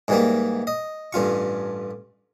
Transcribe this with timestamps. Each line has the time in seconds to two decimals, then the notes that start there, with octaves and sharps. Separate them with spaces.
0.08 G#2 E3 G3 A#3
0.67 D#5
1.13 A1 G2 F4 C#6